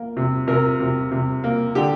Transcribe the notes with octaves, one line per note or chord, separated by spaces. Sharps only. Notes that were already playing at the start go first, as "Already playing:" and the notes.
Already playing: A#3
C3
C3 A#4
C3
C3
A#3
D3 G4